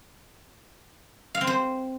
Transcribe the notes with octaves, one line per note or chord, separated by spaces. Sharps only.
F5
C4
C5